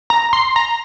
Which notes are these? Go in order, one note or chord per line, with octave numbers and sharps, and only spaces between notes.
A#5
C6
A#5